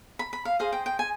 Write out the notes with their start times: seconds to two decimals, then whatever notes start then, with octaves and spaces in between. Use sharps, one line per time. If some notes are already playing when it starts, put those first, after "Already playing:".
0.19 B5
0.33 B5
0.45 F5
0.59 G#4 C5 D#5 F5
0.72 G5
0.86 G5
0.99 G#5